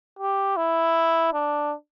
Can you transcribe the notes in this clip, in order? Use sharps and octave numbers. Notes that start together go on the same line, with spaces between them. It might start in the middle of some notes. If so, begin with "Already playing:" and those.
G4
E4
D4